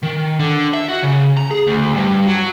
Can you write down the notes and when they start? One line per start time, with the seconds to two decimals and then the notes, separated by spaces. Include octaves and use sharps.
0.03 D#3
0.40 D3
0.74 E5
0.89 F#4
1.03 C#3
1.37 A#5
1.51 G#4
1.67 D2
1.94 G2
2.27 F#3